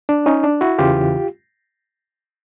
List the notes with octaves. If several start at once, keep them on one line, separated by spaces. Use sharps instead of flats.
D4
C#4 D#4
D4
E4 F#4
E2 C#3 E3 F4 G4